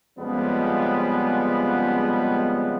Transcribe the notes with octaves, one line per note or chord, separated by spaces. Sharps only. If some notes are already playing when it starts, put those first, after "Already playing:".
F2 C#3 F3 G3 G#3 B3